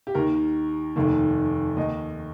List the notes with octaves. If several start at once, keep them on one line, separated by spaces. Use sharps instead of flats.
G4
D#2 D#3 A#4
F1 D#2 D#3
D#2 D#3 D#5